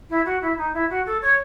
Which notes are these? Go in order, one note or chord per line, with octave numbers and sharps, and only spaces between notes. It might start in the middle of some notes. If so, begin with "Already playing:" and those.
E4
F#4
E4
D#4
E4
F#4
A4
C#5